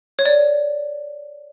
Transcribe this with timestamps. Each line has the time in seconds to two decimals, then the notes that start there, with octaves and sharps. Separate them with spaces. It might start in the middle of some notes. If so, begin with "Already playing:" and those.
0.19 C#5
0.26 D5